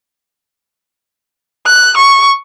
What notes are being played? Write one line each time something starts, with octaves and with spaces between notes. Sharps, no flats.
F#6
C#6